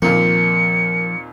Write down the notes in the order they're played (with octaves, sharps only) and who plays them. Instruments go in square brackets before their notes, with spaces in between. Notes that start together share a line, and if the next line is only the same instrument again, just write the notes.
[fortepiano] D#2 A#2 C4 [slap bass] F3 [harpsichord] A#3 [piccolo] C#7